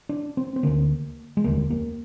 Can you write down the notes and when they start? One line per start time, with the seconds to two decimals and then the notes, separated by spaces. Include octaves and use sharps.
0.09 D4
0.37 C4
0.56 C4
0.63 D2 D3 A#3
1.37 G#3
1.44 F1 D#2 D3 A#3
1.70 A#3